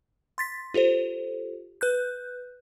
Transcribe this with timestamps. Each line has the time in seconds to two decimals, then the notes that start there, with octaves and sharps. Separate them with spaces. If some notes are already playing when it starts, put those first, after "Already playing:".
0.38 C6 A6 B6
0.74 F4 G4 A4 C5
1.81 B4 F#6 G6